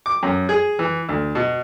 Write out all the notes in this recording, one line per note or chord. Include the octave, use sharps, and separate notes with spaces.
D6
F#2
G#4
E3
D2
B2